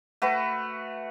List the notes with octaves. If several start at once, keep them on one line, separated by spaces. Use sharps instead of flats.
A3 F#4 B4